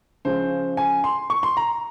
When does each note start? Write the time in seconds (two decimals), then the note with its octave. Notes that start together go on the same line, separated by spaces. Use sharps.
0.25 C#3 F3 G#3 C#4 C5
0.77 G#5
1.04 C6
1.30 C#6
1.43 C6
1.57 A#5